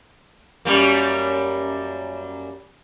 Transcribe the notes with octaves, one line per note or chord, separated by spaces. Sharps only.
F#2 G3 A#3